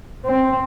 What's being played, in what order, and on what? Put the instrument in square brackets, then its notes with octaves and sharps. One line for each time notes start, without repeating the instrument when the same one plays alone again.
[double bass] C4